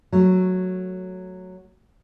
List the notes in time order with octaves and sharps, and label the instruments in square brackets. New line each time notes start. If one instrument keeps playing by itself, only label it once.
[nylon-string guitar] F#3 A3